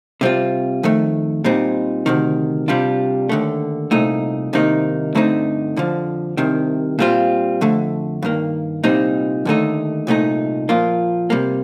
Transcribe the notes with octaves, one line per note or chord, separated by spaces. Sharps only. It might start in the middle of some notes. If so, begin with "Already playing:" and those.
C3 G3 C4 F4
F2 D#3 A3
A#2 G3 C4 D#4
D2 C3 D#3
C3 G3 D4 F4
D#2 D3 A3
C2 A#2 A3 D#4
C2 C3 D#3 A#3 D#4
G2 D3 A3 C4 D#4
F2 D3 F3
C2 C3 D#3
A#2 G3 C4 F4
F2 D3 A3
G2 D#3 A#3
C2 A#2 G3 C4 D#4
D#2 D3 A3 D#4
C2 A#2 A3 D#4
A#2 F3 A#3 F4
C3 G3 A#3